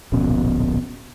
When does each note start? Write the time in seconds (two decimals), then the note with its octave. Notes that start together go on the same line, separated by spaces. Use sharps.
0.12 D1 A#1 B2 C#4